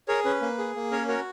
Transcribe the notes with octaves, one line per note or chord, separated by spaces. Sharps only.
G#4 A#4 C#5
C#4 B4
A#3
G#4
A#3
C#4 A#4 C#5
F#4 A#4 C#5